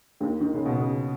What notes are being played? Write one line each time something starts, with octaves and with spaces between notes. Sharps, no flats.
D#2 D#3
D#3
C#3
B2
C#3